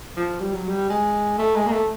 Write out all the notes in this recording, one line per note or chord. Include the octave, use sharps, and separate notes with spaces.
F3
G3
F#3
G3
G#3
A3
G#3
A#3
A3